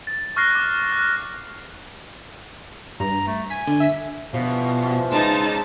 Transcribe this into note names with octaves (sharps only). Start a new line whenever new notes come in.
A6
C#6 F6 F#6 A#6 C7
D6
F#6
G2 A#5
A3
G#5 B6
D3
E5 B6
G2 B2 E3 F3
G#3 C#4 D#4 A5